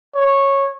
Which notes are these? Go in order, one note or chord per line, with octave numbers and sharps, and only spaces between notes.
C#5